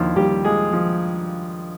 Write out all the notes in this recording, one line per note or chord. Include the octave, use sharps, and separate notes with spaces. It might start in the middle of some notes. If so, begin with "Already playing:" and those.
Already playing: D#2 D3 F3 E4 F4
D#2 G3 G4
F3 G#3 G#4
F3